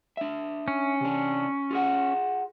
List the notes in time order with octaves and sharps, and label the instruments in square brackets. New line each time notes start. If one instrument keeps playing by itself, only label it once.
[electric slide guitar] D4 E5
[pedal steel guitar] C#4
[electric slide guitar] C3 D4
F4 G#4 F#5